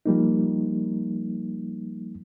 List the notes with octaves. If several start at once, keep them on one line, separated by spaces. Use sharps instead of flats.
F3 G3 A#3 D#4